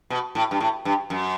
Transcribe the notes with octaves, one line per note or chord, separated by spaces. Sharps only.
B2
A2
G2
A2
G2
F#2